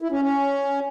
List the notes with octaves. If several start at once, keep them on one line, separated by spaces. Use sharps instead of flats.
E4
C#4
C#4